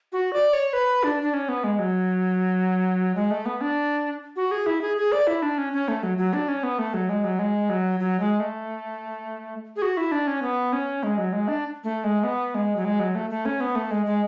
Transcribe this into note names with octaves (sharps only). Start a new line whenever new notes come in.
F#4
D5
C#5
B4
D4
D4
C#4
B3
G#3
F#3
G#3
A3
B3
D4
F#4
G#4
E4
G#4
G#4
D5
E4
D4
C#4
C#4
A3
F#3
F#3
D4
C#4
B3
A3
F#3
G#3
F#3
G#3
F#3
F#3
G#3
A3
G#4
F#4
E4
D4
C#4
B3
C#4
G#3
F#3
G#3
D4
A3
G#3
B3
G#3
F#3
G#3
F#3
A3
A3
C#4
B3
A3
G#3
G#3